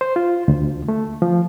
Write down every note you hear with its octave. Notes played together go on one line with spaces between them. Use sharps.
C5
F4
D2
A3
F3